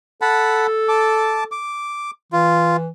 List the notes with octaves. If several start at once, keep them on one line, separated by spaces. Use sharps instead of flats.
A4 F#5 A5 B5
A5 D6
D6
E3 F4